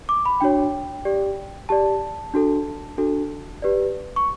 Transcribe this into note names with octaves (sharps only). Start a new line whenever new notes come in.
D6
B5
D4 F#4 C#5 G5
G4 D5
G4 D5 A5
D4 F#4 A4
D4 F#4 A4
G4 B4 D5
C#6